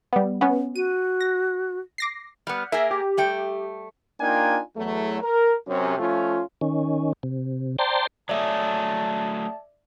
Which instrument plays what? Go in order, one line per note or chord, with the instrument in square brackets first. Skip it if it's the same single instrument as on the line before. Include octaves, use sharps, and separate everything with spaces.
[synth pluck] G3 B3
B3 C#4
[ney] F#4 [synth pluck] D#7
[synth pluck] A#6
D6 A#6 C7
[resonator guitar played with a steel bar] G3 B3 [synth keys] F6
[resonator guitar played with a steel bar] A#3 G#4 A#4 [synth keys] E5
[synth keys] G4
[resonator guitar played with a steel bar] G3 A3 G5
[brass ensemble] A#3 D4 D#4 F4 G5 G#5
E2 F#3 A3
A#4
F#2 C3 C#4
F3 A3 C#4 F4
[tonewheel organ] D#3 C#4
C3
C5 D5 G5 A5 A#5 C6
[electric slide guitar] F#3 A3 G#4 [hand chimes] D5 E5 [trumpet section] A5